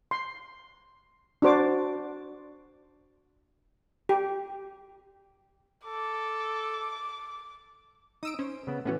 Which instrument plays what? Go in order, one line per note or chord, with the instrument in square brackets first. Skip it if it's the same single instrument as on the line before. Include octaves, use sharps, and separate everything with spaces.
[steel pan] C6
D4 F#4 C5 D6
G4
[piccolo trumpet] A4 [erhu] D6
[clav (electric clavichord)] D#4 [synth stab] D#6 E6 D7
[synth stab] C#4 [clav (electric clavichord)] C5
[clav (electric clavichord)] C#3 B3
[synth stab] A2 C#4 F#4 [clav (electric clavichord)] E3 B3